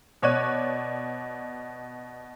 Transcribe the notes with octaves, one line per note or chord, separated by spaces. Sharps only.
B2 C#5 D5 F#6 D#7